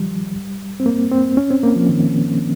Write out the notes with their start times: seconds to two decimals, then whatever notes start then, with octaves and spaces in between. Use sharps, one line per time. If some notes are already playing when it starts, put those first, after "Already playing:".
Already playing: D#3 F3 G3
0.80 C4
0.86 A#3
1.12 C4
1.37 C#4
1.50 C4
1.63 A#3
1.76 F3
1.89 D#3